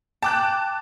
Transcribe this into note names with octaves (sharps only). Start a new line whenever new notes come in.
G5 A5 D6 F#6